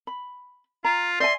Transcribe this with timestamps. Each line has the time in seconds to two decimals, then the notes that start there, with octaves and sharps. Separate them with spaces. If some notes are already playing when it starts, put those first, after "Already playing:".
0.07 B5
0.84 F4 A#5
1.20 D5 E5 G#5 C6